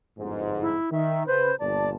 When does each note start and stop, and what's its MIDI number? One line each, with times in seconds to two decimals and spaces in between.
0.18 0.76 31
0.18 0.76 41
0.18 0.76 44
0.62 0.90 64
0.92 1.26 51
0.92 1.23 76
1.27 1.51 49
1.27 1.51 71
1.27 1.56 72
1.60 1.96 31
1.60 1.96 46
1.60 1.90 74
1.60 1.96 81